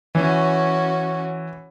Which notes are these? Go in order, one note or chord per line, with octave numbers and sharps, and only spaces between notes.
E3 C#4 F#4